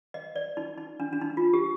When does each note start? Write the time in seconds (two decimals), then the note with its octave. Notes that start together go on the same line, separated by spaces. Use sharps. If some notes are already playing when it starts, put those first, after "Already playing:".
0.14 D#5
0.36 D5
0.57 D#4
0.78 D#4
1.00 D4
1.13 D4
1.21 D#4
1.37 F4
1.53 G4